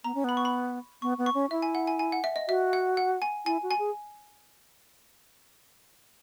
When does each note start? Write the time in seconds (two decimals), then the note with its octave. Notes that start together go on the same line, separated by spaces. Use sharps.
0.04 B3 A#5
0.15 C#4
0.24 B3 B5
0.37 C#6
0.45 B5
1.02 B3 C#6
1.18 B3
1.26 C#6
1.34 C#4
1.51 E4 E5
1.62 G#5
1.75 F#5
1.87 G#5
1.99 G#5
2.12 F#5
2.24 E5
2.36 D#5
2.49 F#4 E5
2.73 F#5
2.97 F#5
3.22 G#5
3.46 E4 G#5
3.63 F#4
3.71 G#5
3.79 G#4